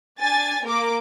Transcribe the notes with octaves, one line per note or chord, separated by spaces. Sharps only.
D4 G#5 A6
A#3 A#4 D6